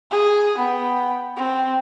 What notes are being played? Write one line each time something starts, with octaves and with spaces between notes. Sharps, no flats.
G#4
B3 G5
C4